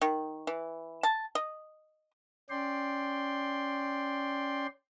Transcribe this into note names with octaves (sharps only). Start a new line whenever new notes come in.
D#3
E3
A5
D#5
C#4 D5 G5 C6